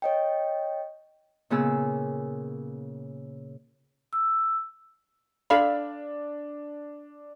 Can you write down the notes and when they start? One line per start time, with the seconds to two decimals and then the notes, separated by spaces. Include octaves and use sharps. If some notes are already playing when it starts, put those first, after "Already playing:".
0.02 C#5 D#5 G5
1.50 A#2 C#3 B3 G#4 E6
4.13 E6
5.50 D4 A4 F5 B5